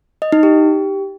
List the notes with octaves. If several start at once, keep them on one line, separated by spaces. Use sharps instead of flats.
D#5
D#4
G4